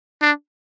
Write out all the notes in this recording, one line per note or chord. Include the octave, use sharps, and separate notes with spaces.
D4